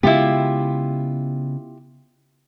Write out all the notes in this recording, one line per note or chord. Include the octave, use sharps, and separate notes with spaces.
C#3 G#3 B3 E4 F4 G4